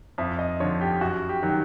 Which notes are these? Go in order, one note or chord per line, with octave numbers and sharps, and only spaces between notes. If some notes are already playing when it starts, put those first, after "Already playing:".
F2 E5
D#5
D3 F3 C#5
G4
F#2 F#4
G4
D#3 F#3